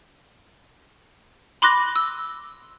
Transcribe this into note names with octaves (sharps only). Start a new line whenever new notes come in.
B5 C6 D6 F#6 A#6
E6